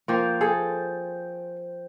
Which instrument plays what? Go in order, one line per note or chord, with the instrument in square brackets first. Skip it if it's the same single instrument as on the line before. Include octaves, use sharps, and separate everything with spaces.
[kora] F3 A#3 [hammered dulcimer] C5 G5 C#6
[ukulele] G#4 [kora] A4